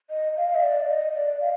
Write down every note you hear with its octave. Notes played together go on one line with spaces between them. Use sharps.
D#5
F5
D#5
D5
D#5
D5
F5